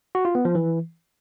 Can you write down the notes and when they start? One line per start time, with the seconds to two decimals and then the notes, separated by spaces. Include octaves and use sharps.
0.15 F#4
0.25 F4
0.35 B3
0.45 F3
0.55 E3